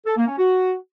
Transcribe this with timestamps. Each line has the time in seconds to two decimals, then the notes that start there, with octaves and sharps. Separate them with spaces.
0.06 A4
0.17 A#3
0.28 C#4
0.39 F#4